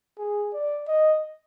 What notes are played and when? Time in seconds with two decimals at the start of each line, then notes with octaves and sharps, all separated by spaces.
0.19 G#4
0.54 D5
0.88 D#5